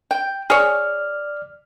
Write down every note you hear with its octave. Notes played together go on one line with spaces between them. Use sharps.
G5
G#4 C#5 D5 F6